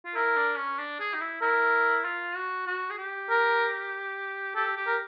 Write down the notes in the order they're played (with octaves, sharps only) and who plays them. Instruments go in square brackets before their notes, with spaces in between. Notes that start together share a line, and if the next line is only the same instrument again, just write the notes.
[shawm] F4
[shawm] E4 [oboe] A#4
[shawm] D4
C#4
D4
G#4
D#4
E4
[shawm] E4 [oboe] A#4
[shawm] F4
F#4
F#4
G#4
G4
[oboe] A#4
[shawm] G4 [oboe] A4
[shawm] G4
[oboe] A#4